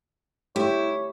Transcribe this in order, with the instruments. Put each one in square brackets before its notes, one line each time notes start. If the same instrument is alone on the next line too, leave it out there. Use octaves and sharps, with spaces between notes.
[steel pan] A3 G4 [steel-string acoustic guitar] E4 [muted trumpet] C#5